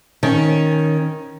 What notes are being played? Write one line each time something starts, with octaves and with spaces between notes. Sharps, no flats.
D#3 C#4